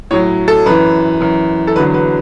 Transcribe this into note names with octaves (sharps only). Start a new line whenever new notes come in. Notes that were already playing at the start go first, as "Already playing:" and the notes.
A2 F#3 C#5
A4
F#2 E3 B4
F#2 E3
A4
E2 D3 F#3 B4
B4